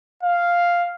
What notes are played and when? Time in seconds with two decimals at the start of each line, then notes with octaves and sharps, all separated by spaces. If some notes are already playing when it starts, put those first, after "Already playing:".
0.23 F5